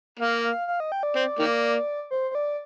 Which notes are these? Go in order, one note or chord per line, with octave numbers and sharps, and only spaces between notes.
A#3 F5
F5
F5
D#5
G5
D5
C4
D#3 A#3
C5
C5
D5